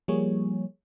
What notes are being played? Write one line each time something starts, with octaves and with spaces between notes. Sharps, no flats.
F3 G3 A#3 G#4 C#5